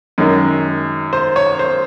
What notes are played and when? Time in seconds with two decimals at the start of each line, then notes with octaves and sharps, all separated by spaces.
0.18 F#2 D#3 G#3
1.13 C5
1.36 C#5
1.59 C5